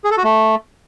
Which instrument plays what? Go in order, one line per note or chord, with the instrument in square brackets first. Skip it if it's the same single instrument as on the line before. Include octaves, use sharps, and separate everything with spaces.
[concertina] G#4
A4
F#4
A3